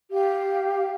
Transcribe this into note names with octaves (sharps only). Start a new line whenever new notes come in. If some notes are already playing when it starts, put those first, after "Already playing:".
G4 F5